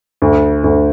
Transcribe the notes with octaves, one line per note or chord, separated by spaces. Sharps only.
D2
D2